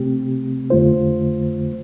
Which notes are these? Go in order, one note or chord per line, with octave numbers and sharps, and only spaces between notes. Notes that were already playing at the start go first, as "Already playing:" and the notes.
Already playing: C3 A3 C4 G4
F2 D3 A3 F4 C5